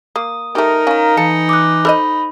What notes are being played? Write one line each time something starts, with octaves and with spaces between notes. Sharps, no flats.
A#3 D#6
A3 D#4 G4 A#4
C#4 F5 A#5
E3 A4 C#7
D6 D#6 F#6
A4 C5 D#5 B5